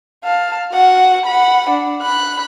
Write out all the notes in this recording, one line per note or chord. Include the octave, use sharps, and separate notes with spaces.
F5 A5
F#4 F#5
F#5 B5
D4
B5 F#6